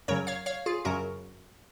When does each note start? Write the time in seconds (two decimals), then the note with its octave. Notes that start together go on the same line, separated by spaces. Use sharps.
0.08 F#2 C#3 F#3 A#4 C#5
0.27 C#5 F5
0.46 C#5 F5
0.66 F4 G#4
0.85 F#2 C#3 F#3 F#4 A#4